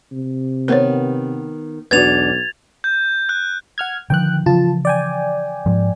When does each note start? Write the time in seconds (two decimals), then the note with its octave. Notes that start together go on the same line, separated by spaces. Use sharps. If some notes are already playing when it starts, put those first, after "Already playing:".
0.12 C3
0.68 D#3 B3 A#4 C5 C#5
1.91 B1 E2 D4 F#4 B4 G#6 A6 F7
2.84 G6
3.29 F#6
3.78 F#5 F6 G#6
4.10 D3 D#3 F3 G5 F#6
4.46 C#3 E3 F3 F4 A5
4.85 D5 G5 G#5
5.66 G#2 F3